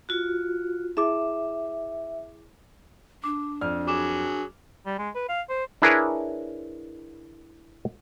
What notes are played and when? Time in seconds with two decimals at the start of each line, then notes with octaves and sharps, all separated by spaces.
0.09 F4 F#4
0.97 E4 G#4 E5 D6
3.24 D4 D6
3.61 F2 D5 F6
3.88 F#3 G#4 D6 E7
4.86 G3
4.98 G#3
5.15 B4
5.29 F5
5.49 C5
5.82 D4 E4 G#4 A#4 B4 C#5